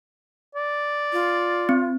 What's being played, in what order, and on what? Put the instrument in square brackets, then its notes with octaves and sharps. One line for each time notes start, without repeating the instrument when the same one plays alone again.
[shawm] D5
[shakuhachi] F4
[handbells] C4